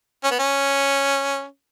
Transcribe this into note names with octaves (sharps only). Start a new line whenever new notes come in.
C#4
B3
C#4